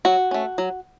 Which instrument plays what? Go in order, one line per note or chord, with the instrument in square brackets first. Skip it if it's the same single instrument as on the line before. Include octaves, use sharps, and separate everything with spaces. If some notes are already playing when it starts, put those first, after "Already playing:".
[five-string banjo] F#3 F#4
A3 C#4
F#3